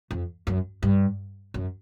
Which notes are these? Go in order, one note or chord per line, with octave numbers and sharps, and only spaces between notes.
F2
F#2
G2
F#2